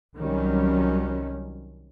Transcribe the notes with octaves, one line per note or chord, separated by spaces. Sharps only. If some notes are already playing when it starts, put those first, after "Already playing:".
C2 D#3 F#3 G3 C#4